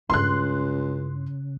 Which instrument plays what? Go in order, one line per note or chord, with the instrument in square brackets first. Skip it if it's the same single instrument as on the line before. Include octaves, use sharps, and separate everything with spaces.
[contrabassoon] C#2 [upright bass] G2 E4 [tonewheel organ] C#3 [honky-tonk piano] C6 F#6